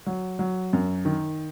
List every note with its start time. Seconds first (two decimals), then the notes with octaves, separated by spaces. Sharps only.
0.07 F#3
0.39 F#3
0.73 F#2
1.05 D#3